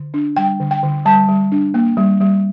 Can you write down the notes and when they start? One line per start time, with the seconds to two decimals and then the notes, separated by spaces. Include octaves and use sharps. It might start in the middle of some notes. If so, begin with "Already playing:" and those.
Already playing: D3
0.14 D4
0.37 G3 G5
0.60 D3
0.71 G5
0.83 D3
1.05 G3 A5
1.29 G3
1.52 D4
1.74 A#3
1.97 G3
2.20 G3